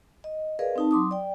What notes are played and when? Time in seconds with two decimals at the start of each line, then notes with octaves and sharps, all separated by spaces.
0.24 D#5
0.59 G#4 A#4 B4 D5 D#5 F5
0.76 C4 D#4 A5
0.91 F#3 C6 D6 D#6
1.11 D5 G5